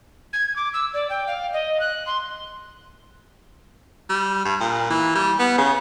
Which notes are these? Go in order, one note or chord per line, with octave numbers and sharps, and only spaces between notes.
G#6
D6
E6
D5
G5
F5
D#5
F#6
C6
G3
G2
A#2
E3
G3
B3
C#3